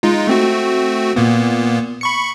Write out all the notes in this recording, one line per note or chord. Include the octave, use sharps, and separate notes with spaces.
G#3 D#4 F4
A3 C4 F#4
A#2 A#3 B3
B5 C#6 C#7